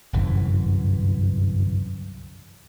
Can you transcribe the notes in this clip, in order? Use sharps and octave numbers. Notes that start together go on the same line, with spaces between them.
G1 C2 F#2 E3